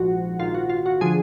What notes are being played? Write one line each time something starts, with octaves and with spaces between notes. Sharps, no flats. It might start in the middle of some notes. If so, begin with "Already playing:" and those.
Already playing: A#1 G#2 F3 F#4
A#1 G#2 D#3 F4
F#4
F4
F#4
D3 F3 G#4